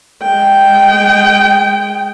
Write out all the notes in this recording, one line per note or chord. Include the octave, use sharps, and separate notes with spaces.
G#3 G5